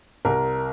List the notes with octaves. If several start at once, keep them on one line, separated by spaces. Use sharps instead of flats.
C2 C3 A#4